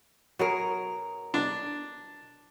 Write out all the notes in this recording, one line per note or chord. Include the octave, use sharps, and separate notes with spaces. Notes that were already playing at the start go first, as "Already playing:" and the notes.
B2 F#3 G#4 A#4
D4